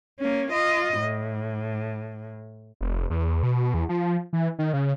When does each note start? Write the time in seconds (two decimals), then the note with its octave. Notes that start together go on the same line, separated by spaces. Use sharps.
0.19 A#3 C#4
0.52 F4 D#5
0.99 A2
2.81 F1
3.10 E2
3.43 B2
3.74 E2
3.89 F3
4.33 E3
4.59 D#3
4.73 C#3